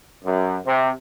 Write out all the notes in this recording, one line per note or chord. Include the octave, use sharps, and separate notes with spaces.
F#2
C3